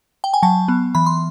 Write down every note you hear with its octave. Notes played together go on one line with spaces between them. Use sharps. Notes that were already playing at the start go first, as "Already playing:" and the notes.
G5
G#5
F#3 A5
B3
E3 B5
C6